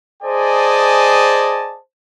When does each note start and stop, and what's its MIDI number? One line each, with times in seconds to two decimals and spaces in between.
0.23 1.78 68
0.23 1.78 72
0.23 1.78 74
0.23 1.78 75
0.23 1.78 80
0.23 1.78 81